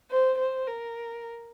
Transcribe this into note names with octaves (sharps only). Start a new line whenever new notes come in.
C5
C5
A#4